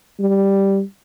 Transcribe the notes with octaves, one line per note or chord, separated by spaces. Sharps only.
G3